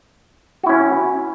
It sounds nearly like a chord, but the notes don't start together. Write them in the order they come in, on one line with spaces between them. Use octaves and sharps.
F#4 E4 C#4